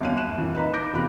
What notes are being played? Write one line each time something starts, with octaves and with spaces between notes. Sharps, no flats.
G1 D#2 F#3 F5 F#6 D#7
F#6 E7
F2 A#2 E3 A#3
D#4 B4 A#5 B5
D6 G6 A#6 D7
E2 C3 F4 G4 B5 F#6